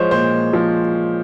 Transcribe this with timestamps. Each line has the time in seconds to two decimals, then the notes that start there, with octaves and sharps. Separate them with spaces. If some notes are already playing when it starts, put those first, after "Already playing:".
Already playing: F3 G#3 C5 C#5
0.11 A#2 C5
0.33 A#2
0.53 F3